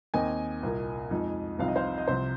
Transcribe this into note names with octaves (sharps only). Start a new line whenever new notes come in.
D#2 D#3 C4 D#5 G#5
C2 A#2 A#3
F2 F3 G#3 D#4
C2 C3 F3 C4 D#4 F5
D#5
C5 F5
D#5
C2 C3 F3 C5